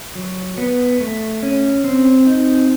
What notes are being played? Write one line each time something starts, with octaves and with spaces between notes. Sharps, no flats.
F#3
B3
A3
C#4
C4
D#4